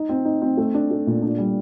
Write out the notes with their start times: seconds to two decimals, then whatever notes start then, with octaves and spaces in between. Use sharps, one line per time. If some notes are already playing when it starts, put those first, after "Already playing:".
Already playing: D#4
0.09 C4
0.25 D#4
0.42 C4
0.57 A3
0.74 D4
0.91 A3
1.07 A#2
1.22 D4
1.38 G3